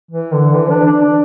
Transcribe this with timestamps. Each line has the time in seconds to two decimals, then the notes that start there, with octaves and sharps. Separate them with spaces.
0.11 E3
0.32 D3
0.54 E3
0.70 D4
0.86 D4
1.02 D4